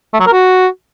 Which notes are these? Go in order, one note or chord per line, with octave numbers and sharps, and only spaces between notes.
A3
F#3
A#4
F#4